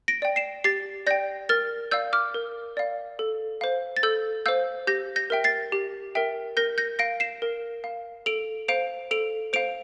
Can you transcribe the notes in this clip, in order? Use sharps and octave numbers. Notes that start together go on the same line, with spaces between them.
A#6 D7
D5 G5
C7 E7
G4 A6 C7
D5 G5 G6 A#6
A#4 F6 A6
D5 F5 E6 G6
D6 F6
A#4
D5 F5
A4
C5 F5
A6
A4 E6 G6
C5 F5 E6 G6
G4 G6 A#6
G6 A#6
A#4 E5 G5
A6 C7
G4
A#4 E5 G5
A#4 G6 A#6
G6 A#6
F5 A#6 D7
C7 E7
A#4
F5
A4 D7 F7
C5 F5 D7 F7
A4 D7 F7
C5 F5 D7 F7